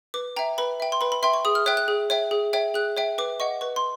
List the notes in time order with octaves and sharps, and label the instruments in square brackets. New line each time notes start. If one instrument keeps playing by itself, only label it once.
[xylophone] B4 D6
E5 G5 A#5
B4 B5
E5 G5
C6
B4 B5
B5
E5 G5 C6
C#6
G#4 D#6
F6
C#5 E5 G5 F#6
F#6
G#4
C#5 E5 G5
G#4
C#5 E5 G5
G#4 F#6
C#5 E5 G5
B4 D6
D#5 F#5 C#6
B4 C#6
C6